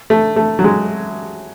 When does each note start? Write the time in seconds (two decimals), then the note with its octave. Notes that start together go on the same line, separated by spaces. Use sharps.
0.10 A3
0.36 A3
0.59 F#3
0.64 G#3